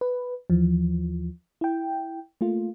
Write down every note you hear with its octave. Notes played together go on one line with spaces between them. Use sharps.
B4
D#2 E3 F3
E4 G5
A3 A#3 F4